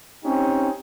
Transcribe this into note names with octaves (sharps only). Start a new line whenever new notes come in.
C4 C#4 D#4 G4